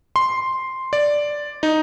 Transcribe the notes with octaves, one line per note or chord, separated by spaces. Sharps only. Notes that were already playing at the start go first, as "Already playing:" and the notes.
C6
D5
D#4